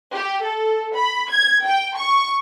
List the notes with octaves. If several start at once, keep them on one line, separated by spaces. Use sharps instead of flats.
G4
A4
B5
G#6
G5
C#6